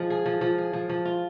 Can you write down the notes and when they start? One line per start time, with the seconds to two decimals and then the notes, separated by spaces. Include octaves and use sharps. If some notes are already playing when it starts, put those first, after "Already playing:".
Already playing: F3 G#3
0.10 G#4
0.26 F3
0.41 F3
0.58 G#4
0.73 F3
0.89 F3
1.05 F4